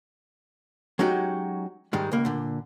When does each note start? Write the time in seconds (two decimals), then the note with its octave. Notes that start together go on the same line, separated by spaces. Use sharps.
0.99 F#3 G#3 C#4 D#4 F#4 G4
1.93 G#2 D#3 G3 G#3
2.12 C#2 A#3
2.25 A#2 D3